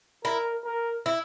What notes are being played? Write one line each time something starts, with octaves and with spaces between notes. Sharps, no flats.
E4 A#4
A#4
E4